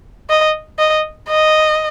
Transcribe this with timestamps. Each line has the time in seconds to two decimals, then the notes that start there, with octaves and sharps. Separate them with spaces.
0.30 D#5
0.79 D#5
1.29 D#5